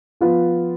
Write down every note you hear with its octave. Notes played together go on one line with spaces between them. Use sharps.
F3 B3 F4 B4